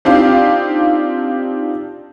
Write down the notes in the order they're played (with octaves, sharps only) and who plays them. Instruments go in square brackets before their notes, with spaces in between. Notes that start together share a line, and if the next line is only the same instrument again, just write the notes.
[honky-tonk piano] C4 D4 D#4 F4 G4 F5